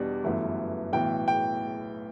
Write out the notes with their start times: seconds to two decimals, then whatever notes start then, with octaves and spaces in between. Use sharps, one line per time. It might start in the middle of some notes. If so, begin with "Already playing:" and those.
Already playing: E2 B2 G3 D4
0.24 G1 F#2 E3 A3
0.93 B1 A2 E3 G5
1.28 G5